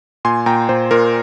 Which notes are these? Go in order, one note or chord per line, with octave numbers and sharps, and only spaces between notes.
A#2 G#5 C6
A#2 G5 A#5
A#2 C5
A#2 A#4